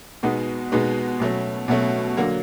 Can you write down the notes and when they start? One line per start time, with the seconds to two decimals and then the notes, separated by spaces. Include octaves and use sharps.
0.23 B2 G#3 B3 D#4 F#4
0.72 B2 G#3 B3 D#4 F#4
1.20 B2 F#3 A3 C#4
1.68 B2 F#3 A3 C#4
2.17 D3 F#3 A#3